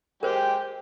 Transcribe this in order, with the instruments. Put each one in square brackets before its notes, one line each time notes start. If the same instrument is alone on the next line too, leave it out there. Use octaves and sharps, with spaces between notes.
[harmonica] G#3 G4 [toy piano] A#4 C5 [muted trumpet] G5